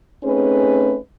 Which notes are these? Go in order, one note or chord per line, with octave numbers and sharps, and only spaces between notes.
A3 C4 C#4 D#4 G#4 B4